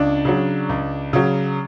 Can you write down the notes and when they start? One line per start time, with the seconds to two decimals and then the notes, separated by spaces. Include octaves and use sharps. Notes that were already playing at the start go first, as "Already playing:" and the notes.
Already playing: C#2 D4
0.25 C#3 F#3
0.69 C#2
1.13 C#3 F#3